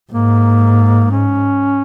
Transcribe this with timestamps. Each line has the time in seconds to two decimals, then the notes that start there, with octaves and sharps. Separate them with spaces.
0.12 G#2 A#3
1.11 C#4